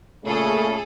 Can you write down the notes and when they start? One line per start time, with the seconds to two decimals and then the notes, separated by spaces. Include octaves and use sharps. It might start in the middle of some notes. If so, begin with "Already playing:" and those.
0.25 A#2 C#3 A3 G#4 A4